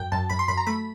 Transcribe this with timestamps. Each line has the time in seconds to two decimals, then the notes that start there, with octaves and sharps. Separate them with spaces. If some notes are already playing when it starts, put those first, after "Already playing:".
Already playing: F#2 G5
0.12 F#2 A5
0.30 F#2 B5
0.39 C6
0.48 F#2 B5
0.57 A#5
0.67 A3 B5